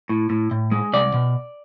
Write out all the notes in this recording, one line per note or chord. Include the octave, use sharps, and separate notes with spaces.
A2
A2
A2
G#3
C2 D5
B2